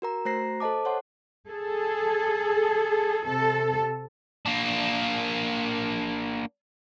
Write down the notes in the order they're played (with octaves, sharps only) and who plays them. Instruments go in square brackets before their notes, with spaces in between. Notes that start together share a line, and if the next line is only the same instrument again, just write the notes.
[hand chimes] F#4 A#4 A#5
A3 F#4 C5 A#5 A#6 C7
A4 C5 D#5 A5 D6
C5 C#5 F#5 C6
[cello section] G#4 A4
C3 A4
[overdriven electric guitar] A#3 D4